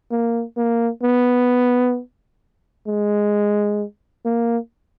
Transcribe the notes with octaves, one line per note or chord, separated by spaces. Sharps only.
A#3
A#3
B3
G#3
A#3